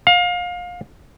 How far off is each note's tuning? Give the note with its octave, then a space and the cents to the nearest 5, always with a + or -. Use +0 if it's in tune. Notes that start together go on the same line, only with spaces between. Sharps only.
F5 +30